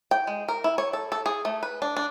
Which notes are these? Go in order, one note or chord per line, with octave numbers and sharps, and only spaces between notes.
G5
G#3
A#4
E4
C#5
A4
A4
G#4
A3
B4
D4
D4